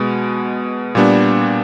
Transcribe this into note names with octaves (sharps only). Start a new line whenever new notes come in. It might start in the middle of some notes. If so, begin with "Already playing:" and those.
Already playing: B2 G#3 B3
A#2 G3 B3 D4